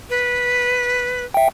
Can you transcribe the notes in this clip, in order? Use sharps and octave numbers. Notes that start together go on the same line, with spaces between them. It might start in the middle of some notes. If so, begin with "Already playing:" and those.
B4
E5 G5